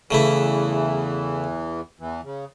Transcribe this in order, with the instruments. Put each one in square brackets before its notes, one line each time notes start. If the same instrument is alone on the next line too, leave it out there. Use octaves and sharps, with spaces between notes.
[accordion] E2 E3 [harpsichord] C#3 A3 E4
[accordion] E2 E3
C#3